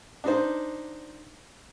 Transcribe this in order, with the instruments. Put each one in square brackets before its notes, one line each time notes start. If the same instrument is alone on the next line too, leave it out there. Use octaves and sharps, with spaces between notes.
[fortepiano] D4 D#4 C5